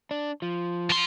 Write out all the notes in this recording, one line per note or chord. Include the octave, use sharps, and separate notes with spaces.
D4
F3
F3 C6